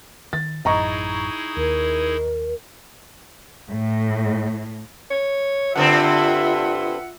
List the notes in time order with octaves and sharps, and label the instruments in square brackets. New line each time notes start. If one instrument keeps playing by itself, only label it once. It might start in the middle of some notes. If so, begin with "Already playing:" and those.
[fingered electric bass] D#3 [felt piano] A6
[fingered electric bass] A1 F#2 [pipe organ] D#4 E4 G#4 [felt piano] D#5 A#5 C#6
[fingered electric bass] D#2 [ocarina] A#4
[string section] A2
[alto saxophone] C#5
[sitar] G2 D3 C4 [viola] F4 E5 [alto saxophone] F#5